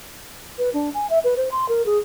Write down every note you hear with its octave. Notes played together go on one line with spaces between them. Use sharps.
B4
D4
G#5
E5
B4
C5
C6
A#4
G#4